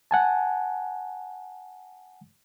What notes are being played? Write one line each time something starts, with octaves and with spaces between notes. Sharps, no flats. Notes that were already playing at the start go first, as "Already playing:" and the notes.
F#5 G#5 A5